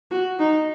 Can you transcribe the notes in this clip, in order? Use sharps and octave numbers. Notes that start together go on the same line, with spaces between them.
F#4
D#4